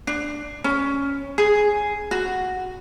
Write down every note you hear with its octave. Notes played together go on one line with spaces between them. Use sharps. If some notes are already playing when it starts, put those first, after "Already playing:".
D4
C#4
G#4
F#4